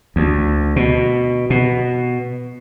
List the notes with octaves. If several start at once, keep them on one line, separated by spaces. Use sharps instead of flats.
D2
B2
B2